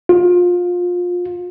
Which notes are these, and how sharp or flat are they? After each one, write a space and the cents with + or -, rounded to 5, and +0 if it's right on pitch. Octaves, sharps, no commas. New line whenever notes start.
F4 +25